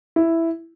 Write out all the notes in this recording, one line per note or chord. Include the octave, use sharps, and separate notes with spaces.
E4